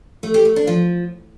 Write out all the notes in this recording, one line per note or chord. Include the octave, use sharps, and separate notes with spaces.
A3
G4
A3
D4
F3